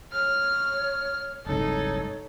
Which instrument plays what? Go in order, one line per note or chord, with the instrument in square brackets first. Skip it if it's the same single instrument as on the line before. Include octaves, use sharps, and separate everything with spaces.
[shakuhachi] C#5 [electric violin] F6
[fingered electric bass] F#1 C2 G#2 [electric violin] D#4 A4 [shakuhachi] C#5